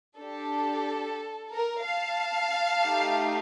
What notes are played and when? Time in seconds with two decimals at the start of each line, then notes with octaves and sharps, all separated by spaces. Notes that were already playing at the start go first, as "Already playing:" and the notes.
0.18 D4 G4 A4
1.51 A#4
1.84 F5 A5
2.84 A3 D#4 G4